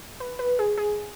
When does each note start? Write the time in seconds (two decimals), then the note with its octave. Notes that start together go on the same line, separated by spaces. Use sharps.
0.20 B4
0.39 B4
0.59 G#4
0.78 G#4